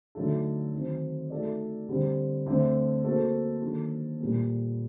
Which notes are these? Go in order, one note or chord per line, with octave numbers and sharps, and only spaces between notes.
D3 F#3 A3 D#4 A4
D#3 F#3 C4
A3 D#4 F#4 A4 D5
D3 G3 C4
D3 A3 C4
A#3 F#4 A4 C5
D#3 F#3 A#3 D4 A4
A#2 G3 A#3